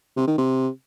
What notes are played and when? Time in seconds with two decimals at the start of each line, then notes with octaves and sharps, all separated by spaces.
0.17 C3
0.27 D#3
0.38 C3